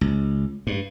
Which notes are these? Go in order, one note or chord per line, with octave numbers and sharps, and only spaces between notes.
C#2
G2